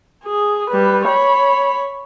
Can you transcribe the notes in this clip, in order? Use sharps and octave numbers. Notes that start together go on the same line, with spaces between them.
G#4
G3 B4
C#5 B5